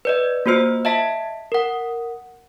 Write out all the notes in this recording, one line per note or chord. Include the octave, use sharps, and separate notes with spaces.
B4 D5 D#5
A#3 F4 F#4 C5 E6
D#5 E5 A5 B6
A#4 F#5